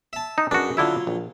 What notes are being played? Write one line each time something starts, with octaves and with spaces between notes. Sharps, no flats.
E5 A5
D#4
F#2 D4 F#4 G#4 B4
D3 F#3 E4 F4 E5
A#1